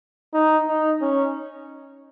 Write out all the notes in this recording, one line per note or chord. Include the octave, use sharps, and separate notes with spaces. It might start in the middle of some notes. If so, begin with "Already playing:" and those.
D#4
D#4
C#4